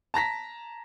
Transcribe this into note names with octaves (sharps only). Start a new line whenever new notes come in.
A5 A#5 A#6 B6